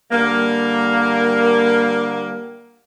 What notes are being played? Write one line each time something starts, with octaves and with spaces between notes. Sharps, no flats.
D3 G3 A#3